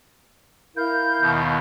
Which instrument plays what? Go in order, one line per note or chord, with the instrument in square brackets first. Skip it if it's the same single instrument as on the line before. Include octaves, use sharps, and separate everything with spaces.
[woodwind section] E4 A#4 F5 [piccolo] G6
[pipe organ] D#2 B2